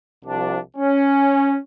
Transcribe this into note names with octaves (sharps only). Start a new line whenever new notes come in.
C2 C3 F3 D4
C#4